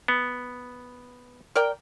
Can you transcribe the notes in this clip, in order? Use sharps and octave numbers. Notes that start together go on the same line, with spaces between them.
B3
A#4 D5 G5